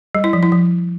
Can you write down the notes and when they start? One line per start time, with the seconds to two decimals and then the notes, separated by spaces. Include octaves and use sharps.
0.15 G3
0.24 E4
0.33 F3
0.43 E4
0.52 F3